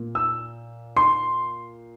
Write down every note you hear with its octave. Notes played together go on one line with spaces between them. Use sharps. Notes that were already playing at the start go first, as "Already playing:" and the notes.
Already playing: A#2
E6
C6